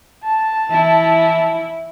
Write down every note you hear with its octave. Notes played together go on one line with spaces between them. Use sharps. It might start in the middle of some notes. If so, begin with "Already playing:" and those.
A5
E3 E4